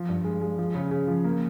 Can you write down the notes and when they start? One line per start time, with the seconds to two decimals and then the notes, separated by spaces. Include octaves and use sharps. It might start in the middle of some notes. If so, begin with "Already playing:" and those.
Already playing: F3
0.09 G2
0.25 G#3
0.42 G#3
0.58 F3
0.75 C#3
0.91 C#3
1.07 F3
1.24 A#3